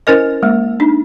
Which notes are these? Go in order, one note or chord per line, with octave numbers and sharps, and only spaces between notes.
C#4 E4 A#4 C5 D#5
G#3 A#3
D4 D#4